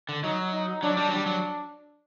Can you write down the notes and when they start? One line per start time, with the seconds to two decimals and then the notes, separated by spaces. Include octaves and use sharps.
0.09 D3
0.23 F#3 D#4
0.52 D#4
0.83 F#3 D4
0.97 G3
1.08 F#3
1.11 G3 D4
1.26 F#3